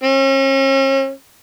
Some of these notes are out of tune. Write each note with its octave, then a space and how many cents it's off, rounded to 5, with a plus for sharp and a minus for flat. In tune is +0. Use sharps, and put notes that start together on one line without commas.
C#4 -40